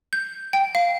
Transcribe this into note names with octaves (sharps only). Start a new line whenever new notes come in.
G6
G5
F5